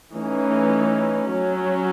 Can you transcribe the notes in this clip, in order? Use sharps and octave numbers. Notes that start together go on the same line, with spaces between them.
E3 A3 C#4 D#4
F#3 C#4